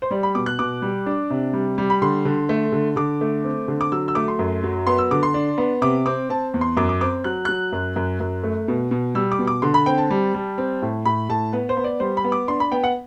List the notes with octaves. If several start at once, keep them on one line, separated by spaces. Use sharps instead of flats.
C5
G3 D5
B5
B2 D6
F#6
B2 D6
G3
D4
C3
G3
G3
B5
D3 C6
D3
A3
D3
D3 D6
A3
C4
D3
D6
F#3 E6
E6
A3 D6
C6
F#2
F#3
B3 C6
E6
D3 D6
C6
D4
B3
C3 D6
C4 D6
C4 A5
E2
C6
F#2 D6
D6
C4 D6
F#3 F#6
F#3 F#6
F#2
F#2
F#2
A3
B2
B2
G3 E6
D6
B2
D6
D3 C6
B5
C4 G5
A5
G3
G3
C4
A2
A2 B5
A2 A5
B3 B4
C5
B3
D5
G3 C5
B5
B3
D6
D4 C6
B5
B3 G5
F#5